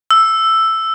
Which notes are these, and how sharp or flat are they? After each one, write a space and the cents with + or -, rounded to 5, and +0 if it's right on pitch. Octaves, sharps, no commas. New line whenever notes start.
E6 +5